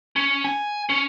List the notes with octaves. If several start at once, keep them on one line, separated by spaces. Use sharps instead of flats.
C#4
G#5
C#4